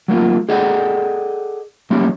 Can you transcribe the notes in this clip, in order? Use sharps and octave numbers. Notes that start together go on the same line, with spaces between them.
F#3 A3 A#3 F4
G#4 A4 D5 D#5 F#5 G5
F#3 G3 A3 A#3 C#4 E4